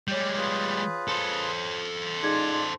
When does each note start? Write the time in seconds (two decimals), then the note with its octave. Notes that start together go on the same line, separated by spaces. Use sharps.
0.08 G3 G#3 G4 C#5 G6
0.37 F4 G#4 B4
1.08 A4 C5
2.23 G#3 D#4 F4 G#4 D5 G#6